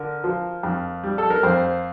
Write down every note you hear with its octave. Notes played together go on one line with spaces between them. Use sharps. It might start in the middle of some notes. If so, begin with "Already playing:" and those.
Already playing: D3 A#4
F3
F2
G3
A4
A#4
F2 C5